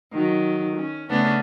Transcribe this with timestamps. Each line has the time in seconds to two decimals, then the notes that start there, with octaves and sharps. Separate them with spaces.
0.12 D#3 F#3
0.76 C#4
1.09 C#3 A3 B3 C#4 D4